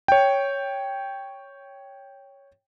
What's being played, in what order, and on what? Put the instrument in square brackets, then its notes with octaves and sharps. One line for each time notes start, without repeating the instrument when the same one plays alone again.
[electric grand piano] C#5 G5